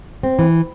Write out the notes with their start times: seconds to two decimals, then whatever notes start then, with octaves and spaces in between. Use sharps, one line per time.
0.23 C4
0.39 E3